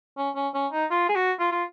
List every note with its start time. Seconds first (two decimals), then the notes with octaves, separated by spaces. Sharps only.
0.18 C#4
0.36 C#4
0.54 C#4
0.72 D#4
0.91 F4
1.09 G#4
1.15 F#4
1.39 F4
1.52 F4